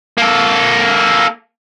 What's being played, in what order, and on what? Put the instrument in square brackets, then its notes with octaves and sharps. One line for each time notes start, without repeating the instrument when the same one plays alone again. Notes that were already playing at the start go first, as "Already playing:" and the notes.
[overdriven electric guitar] A#3 A4